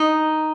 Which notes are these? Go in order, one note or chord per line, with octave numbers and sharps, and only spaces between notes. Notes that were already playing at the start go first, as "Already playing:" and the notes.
Already playing: D#4